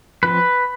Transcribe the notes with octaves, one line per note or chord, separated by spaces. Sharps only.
F3 C4 B4